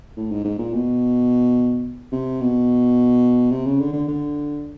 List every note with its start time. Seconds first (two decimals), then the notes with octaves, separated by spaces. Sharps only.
0.17 A2
0.31 G#2
0.44 G#2
0.58 A#2
0.73 B2
2.12 C3
2.41 B2
3.51 C3
3.66 C#3
3.80 D3
3.93 D3
4.08 D3